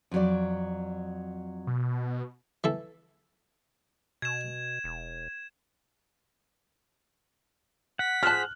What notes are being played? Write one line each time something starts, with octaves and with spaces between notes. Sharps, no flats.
F2 F#3 D5
B2
E3 A4
B2 G#6 E7
E1
F#5 B6
F4 G#4 C5 F#5 A5 F6 F#6